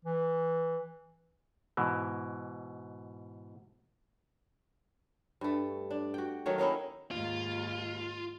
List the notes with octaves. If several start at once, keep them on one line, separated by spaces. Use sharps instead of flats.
E3
G#2 B2 E3
G2 A3
D4
F#4 G5
D#3 F#3 A3 C#5
A#3 C#4 D#4 E4
D#2 G#2 F4